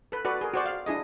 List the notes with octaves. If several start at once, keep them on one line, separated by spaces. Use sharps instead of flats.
A4 B4
F#4 A4 B4 D5
G#4 A#4
F#4 C5 D5
F5
D4 E4 G#4 D#5